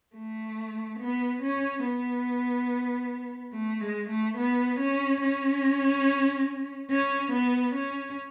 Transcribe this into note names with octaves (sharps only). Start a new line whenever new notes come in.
A3
B3
C#4
B3
A3
G#3
A3
B3
C#4
C#4
C#4
B3
C#4